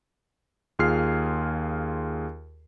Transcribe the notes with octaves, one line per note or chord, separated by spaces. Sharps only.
D#2 F4 G#4 F6 C7